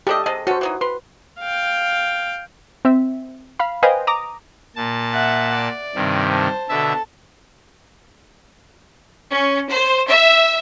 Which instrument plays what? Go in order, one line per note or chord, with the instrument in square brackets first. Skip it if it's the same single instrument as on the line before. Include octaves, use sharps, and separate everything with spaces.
[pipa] A3 D4 D#5 [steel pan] G4 A4
[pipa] C3 G#4 A4 [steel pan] D#5
[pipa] C#4 A4 [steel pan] F#4 C5
[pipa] E3 F#3 D#4
[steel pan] B4 [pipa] C6
[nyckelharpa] F5 G5
[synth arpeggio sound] C4 E5
F5 B5
B4 C5 D#5 F5 G5 G#5
A#5 D6 D#6
[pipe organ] A#2 A5
[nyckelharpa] E5 F#5
D5
[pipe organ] G2 C3 D#3
[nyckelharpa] C5 A5
[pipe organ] B2 D3 E5 [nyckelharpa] A4 A5
[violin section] C#4
C5
E5